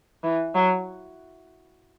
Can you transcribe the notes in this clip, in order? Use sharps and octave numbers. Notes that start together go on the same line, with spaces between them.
E3
F#3